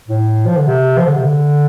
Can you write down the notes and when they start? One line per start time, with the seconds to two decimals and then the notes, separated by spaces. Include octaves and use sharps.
0.08 A2
0.46 F3
0.57 D3
0.67 C3
0.98 F3
1.06 D3
1.15 C3
1.23 D3